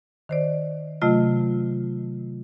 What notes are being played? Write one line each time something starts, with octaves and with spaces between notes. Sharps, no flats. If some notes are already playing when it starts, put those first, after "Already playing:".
D#3 C5 D5
C3 F#3 A3 F4 D#5